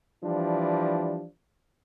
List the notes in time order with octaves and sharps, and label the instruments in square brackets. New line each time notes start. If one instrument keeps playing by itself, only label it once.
[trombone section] E3 F3 G3 D4